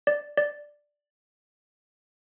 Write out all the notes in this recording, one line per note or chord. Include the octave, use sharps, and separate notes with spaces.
D5
D5